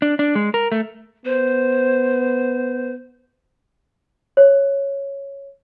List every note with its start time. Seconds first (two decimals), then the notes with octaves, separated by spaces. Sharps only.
0.02 D4
0.19 D4
0.35 G#3
0.54 A#4
0.72 A3
1.26 B3 C5
4.37 C#5